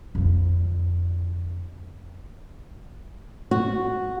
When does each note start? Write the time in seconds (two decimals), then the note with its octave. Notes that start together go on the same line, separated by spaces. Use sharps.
0.15 F2 D3
3.51 F#4